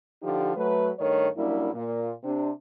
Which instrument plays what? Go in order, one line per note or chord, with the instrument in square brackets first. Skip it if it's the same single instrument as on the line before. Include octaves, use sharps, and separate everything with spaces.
[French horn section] D3 F3 D#4 G4
F#3 A3 B4
G2 D#3 A3 C#5
F#2 G3 A#3 D4 E4
A#2
C3 D4